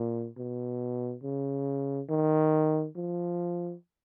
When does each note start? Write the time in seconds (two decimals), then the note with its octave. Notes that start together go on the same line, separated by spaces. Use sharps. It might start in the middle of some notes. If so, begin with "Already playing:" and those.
Already playing: A#2
0.37 B2
1.23 C#3
2.09 D#3
2.96 F3